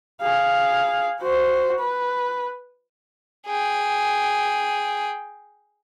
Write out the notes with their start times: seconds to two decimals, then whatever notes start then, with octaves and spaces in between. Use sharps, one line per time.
0.22 G#4 F5
1.21 F#4 C5
1.80 B4
3.47 G#4 G5